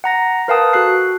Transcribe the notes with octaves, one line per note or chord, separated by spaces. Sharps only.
F#5 A#5 A#6
A#4 B4 F5 G5 A5 D#6
F#4 A4 F#6 C7